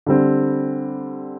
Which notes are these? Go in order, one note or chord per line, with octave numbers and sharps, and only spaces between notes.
D3 G3 C4